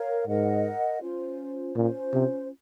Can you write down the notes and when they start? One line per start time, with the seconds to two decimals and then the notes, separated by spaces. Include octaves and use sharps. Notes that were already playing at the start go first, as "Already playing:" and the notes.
Already playing: A#4 C#5 F5
0.27 G#2 A#4 D#5 F#5
1.01 C#4 F4 C5
1.76 A#2 C#4 F4 C5
2.13 C3